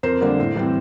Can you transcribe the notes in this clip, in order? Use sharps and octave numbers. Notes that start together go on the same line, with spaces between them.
F2 A#4 C5
D3 G3 A#3 D4
A2
E3 G3 C4